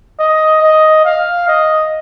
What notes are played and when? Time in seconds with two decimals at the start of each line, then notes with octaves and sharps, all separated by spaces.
0.20 D#5
0.62 D#5
1.05 F5
1.48 D#5